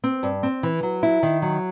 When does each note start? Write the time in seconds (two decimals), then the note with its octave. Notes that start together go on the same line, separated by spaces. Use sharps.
0.04 C4
0.23 G2
0.43 C4
0.63 E3
0.83 F#3
1.03 E4
1.23 D#3
1.42 F#3